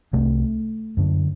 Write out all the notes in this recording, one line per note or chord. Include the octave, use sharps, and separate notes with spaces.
C2 C3 A3
F#2 D3